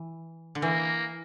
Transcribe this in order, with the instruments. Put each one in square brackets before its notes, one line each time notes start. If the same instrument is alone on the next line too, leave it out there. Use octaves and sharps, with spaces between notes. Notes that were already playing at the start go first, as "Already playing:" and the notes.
Already playing: [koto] E3
D3
[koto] E3 [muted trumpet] A#3